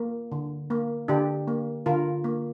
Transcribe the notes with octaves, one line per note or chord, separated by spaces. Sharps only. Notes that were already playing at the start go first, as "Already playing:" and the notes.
Already playing: A#3
D3
A#3
D3 D4 G4
A#3
D3 F4 A#4
A#3